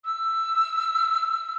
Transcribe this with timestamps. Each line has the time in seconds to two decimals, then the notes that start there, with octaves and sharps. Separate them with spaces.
0.05 E6